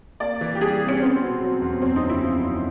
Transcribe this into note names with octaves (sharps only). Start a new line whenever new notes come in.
A#3 D5
E3
G4
G3 G#4
C3
C#4
B3 C4
B2
F#3
E2
F#2 C4
D#4
C#3
E4
F3
F#2